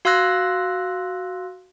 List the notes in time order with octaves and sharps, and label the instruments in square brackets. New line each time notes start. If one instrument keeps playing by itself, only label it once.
[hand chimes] F#4 F5 C6 E6 F#6 A#6